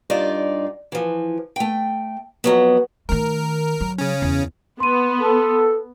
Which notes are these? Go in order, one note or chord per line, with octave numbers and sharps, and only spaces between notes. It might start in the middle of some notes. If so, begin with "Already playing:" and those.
G2 D#4 F4 D5
E3 F3
A3 G5
F2 F#3 B3
D#3 A3 A#4
F#3
C#3 C#4
E2
B3 C6 D#7
A4